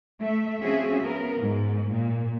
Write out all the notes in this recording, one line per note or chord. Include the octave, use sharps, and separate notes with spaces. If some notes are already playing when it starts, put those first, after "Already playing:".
A3 E5
F3 C4 C#4 F#4 G#4 E5
B3 A#4
G#2
A#2